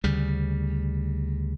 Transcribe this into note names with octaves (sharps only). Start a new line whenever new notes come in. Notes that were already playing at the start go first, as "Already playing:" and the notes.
D2 C#3 G3